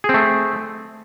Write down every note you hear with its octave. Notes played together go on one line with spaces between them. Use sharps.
A3 C4 G#4